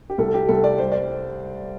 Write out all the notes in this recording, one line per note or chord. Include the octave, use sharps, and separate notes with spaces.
G4
C2 A4
G4
C2 A4
D5
G3 C5
D5